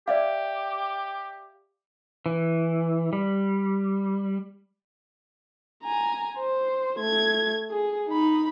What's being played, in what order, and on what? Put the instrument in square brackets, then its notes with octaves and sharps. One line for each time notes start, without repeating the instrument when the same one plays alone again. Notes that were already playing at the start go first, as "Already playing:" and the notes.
[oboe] G4 [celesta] D5 E5 F5
[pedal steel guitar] E3
G3
[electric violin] G#5 A#5
C5
A3 G#6
G#4
D#4 B5